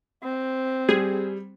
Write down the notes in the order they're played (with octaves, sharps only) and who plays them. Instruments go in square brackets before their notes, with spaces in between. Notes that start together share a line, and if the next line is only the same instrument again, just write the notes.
[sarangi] C4
[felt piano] G3 [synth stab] G#4